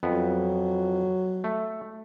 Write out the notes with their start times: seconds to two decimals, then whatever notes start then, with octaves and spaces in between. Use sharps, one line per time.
0.03 F2 F#3 B3
1.44 A3